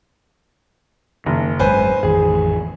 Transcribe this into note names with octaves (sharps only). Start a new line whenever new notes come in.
F#1 D#3
G#1 F#2 G#3 B4 C5 G#5
A1 F2 D#3 G#4